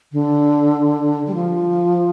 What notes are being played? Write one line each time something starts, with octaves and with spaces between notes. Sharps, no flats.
D3
G3
F3